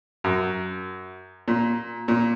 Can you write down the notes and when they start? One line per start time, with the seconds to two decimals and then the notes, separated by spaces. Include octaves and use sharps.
0.24 F#2
1.48 A#2
2.08 A#2